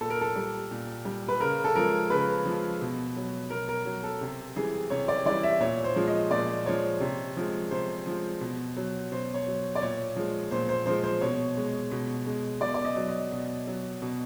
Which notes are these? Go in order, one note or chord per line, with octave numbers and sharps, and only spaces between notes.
A#2 A4
A#4
A4
G3
A#2
G3
B4
C#3 A#4
A4
F3 G#3 A#4
C#3 B4
F3 G#3
B2
F#3
B2 A#4
A#4
F#3
A4
C3
E3 G3 G#4
C3 C#5
D5
E3 G3 D5
E5
A#2 C#5
C5
F3 G#3
D#5
A#2 D5
F3 G#3 C#5
C3
F3 G#3
C3 C5
F3 G#3
B2
F#3
B2 C5
C#5
F#3
D5
A#2 C#5
F3 G#3
A#2 C5
C5
F3 G#3 C5
C5
B2 C#5
G#3
B2
G#3
B2 D5
D5
D#5
F#3
D#5
B2
F#3
B2